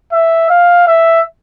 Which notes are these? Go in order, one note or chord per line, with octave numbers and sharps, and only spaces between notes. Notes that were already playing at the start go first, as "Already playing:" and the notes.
E5
F5
E5